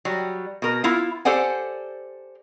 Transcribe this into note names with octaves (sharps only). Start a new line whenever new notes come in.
F#3 G3
B2 A#4
B3 E4 F4
G4 A4 C5 D5 F#5 G#5